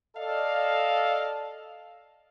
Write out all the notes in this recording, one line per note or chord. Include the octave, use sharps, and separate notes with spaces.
A4 D5 D#5 F5